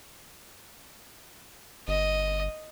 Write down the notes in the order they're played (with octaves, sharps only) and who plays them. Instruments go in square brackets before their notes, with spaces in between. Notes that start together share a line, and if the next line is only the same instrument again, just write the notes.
[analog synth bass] G1 [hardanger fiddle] D#5